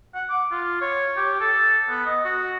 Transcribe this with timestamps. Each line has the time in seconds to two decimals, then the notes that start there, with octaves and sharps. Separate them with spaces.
0.15 F#5
0.29 D6
0.52 F4
0.81 C#5
1.17 G4
1.40 A4
1.89 B3
2.06 D#5
2.25 F#4